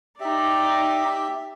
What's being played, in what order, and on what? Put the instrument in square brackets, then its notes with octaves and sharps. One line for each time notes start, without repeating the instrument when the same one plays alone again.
[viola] D#4 D5 [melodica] G4 E5